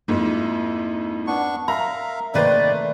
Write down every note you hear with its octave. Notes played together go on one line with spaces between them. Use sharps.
F2 G#2 A#3 E4
B3 D4 C#6
A#4 E5 F5 A#5
C3 D#3 A3 A#3 D#4 B4 C5 D5